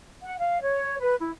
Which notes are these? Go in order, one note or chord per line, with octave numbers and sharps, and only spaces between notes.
F#5
F5
C#5
B4
E4